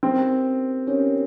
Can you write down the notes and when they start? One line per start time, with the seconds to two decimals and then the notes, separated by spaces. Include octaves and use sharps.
0.03 C4 D#4 G4 A#4
0.87 B3 C#4 D#4 G4 A#4 C#5